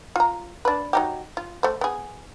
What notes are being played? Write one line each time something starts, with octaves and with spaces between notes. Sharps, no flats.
F4 A#5
D4 B4
F#3 D#4 G4
F4
A3 C5
B3 G#4